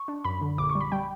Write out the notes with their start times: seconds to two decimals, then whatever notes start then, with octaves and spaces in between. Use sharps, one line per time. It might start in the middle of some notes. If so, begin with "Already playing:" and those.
Already playing: C#6
0.08 D4
0.24 F#2 B5
0.42 D3
0.58 A#1 D6
0.70 C#6
0.75 G3
0.81 B5
0.92 G3 G5